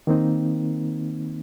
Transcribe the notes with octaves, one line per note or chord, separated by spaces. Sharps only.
D#3 A#3 C4 D#4